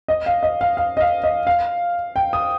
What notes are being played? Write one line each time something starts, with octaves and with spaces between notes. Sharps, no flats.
D#5
F5
D#5
F5
F5
D#5
F5
D#5
F5
G5
D#6